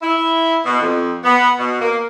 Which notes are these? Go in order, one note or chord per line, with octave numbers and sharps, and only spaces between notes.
E4
B2
F2
B3
B2
A#3